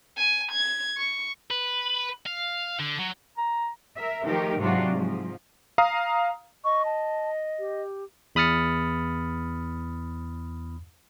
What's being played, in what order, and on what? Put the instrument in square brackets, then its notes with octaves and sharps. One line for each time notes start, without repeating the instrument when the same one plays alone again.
[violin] G#5
G#6
C#6
[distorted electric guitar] B4
F5
D3
F#3
[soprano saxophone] A#5
[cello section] A#4 E5
D#3 F3 A3 D#4 G4 A#4
G#2 C3 F#3 D4 F4 F#4
G#2 F3
[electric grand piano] F5 A#5 D#6
[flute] D#5 [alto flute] C#6
[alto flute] A5
G4
[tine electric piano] E2 B5 D#6 F6 A6 C#7